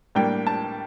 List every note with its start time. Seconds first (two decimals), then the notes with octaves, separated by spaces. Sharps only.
0.15 A2 G3 A#3 D4 G5
0.47 A5